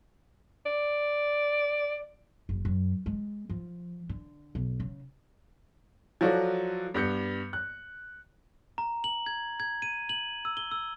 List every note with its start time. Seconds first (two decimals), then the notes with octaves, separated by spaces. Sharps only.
0.66 D5
2.49 F#1
2.65 F#2
3.06 G#3
3.49 F3
4.09 D3
4.55 B1
4.80 C#3
6.21 F3 F#3 F4 F#4 A4 D5
6.94 G2 B3 G6 C#7
7.53 F#6
8.78 A#5
9.04 F#7
9.26 G#6
9.60 G#6
9.82 D#7
10.09 F#7
10.45 E6
10.57 G7
10.71 E6